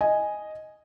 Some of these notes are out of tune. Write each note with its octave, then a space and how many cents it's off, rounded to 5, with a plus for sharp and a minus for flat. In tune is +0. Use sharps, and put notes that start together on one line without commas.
D#5 +0 G#5 +0